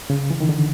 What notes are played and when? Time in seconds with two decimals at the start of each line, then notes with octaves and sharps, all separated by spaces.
0.10 C#3
0.31 E3
0.40 D#3
0.49 D3